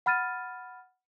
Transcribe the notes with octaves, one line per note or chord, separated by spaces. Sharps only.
F#5 B5 F6 A6 D#7